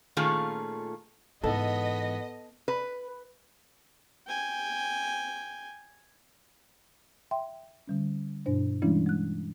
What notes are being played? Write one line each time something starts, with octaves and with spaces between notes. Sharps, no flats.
A#2 D#3 A3 C#4 F4 G#4
G#2 E3 B3 A4 D#5
B4
G5 G#5
E5 G5 C6
D3 G3 C#4
G2 B2 D4 C5
E3 G3 G#3 C#4 D4 E4
G#3 F#6